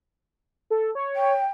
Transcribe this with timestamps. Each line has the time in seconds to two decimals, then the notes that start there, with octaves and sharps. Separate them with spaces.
0.70 A4
0.95 C#5
1.15 G5